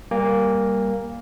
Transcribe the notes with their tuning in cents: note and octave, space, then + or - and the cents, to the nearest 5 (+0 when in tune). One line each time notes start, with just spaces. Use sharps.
G3 +0 A#3 +0 G#5 -45